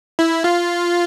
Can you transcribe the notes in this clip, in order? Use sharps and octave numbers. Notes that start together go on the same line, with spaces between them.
E4
F4